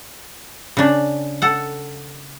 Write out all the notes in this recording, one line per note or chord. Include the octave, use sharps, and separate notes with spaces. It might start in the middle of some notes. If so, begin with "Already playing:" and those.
C#3 D4
A4 F#5